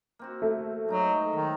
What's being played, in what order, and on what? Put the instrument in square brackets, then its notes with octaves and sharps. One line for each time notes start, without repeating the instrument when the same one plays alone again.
[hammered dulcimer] A#3 C4 F#4
[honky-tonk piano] A3
[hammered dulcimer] G#2 D#4 D#5 [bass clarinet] F#3
[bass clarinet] D#3 [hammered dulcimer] E5